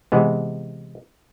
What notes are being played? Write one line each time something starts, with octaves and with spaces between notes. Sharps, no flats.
C3 E3 G#3 B3